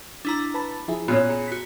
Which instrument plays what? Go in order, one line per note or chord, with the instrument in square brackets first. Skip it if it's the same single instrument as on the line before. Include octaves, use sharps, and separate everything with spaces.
[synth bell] D4 E4 A#5
[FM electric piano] B4 A5 B5
F3 E4 G#4
[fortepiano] A#2 C#4 [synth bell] B3
[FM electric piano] G#4 A#5 C#7
[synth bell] F#4 B6